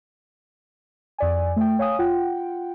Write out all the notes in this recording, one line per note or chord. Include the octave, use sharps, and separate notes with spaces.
F2 D5 G#5
A3 G5
C#5 F5 G#5 D#6
F4 F#5 G5